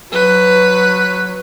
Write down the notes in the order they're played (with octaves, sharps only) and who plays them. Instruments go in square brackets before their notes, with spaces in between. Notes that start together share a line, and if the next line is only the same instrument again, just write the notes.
[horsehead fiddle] F#3 [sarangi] B4